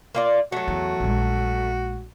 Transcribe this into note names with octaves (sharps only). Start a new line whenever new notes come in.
A#3 F4 D5
F#3 A3 F#4
E2
A#1 G#3